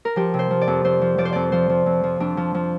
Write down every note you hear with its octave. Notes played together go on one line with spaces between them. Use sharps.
A#4
F3 G4
C3
C5
F3
D5
F2
F2 C5
F3
F3 D5
C5
F2 D5
F3 C5
F3
F2
F3
F2 D4
F3
F3